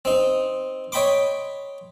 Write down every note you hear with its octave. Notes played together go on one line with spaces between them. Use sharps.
C4 D#4
C#5 D#5 G5 B5 C6 D6